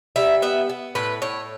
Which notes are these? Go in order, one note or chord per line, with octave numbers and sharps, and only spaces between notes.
G3 E5
B3 E5
B3
A2 B4
A2 C#5